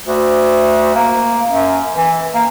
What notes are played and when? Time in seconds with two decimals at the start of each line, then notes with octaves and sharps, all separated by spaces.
0.06 D2
0.95 A#3
1.48 F#2
1.94 E3
2.34 A#3